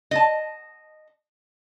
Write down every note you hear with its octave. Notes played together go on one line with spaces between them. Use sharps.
D#5 A5